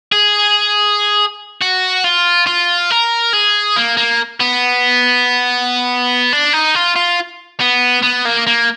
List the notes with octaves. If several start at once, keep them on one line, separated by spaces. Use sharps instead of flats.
G#4
F#4
F4
F4
A#4
G#4
A#3
A#3
B3
D4
D#4
F4
F4
B3
B3
A#3
A#3